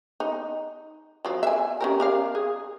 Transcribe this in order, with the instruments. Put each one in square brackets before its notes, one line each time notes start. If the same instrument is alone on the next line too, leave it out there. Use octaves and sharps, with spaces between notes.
[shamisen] D#4
F3 F#3
E5 G#5
C#4 G4 A#4
G4 A#4 F5
G#4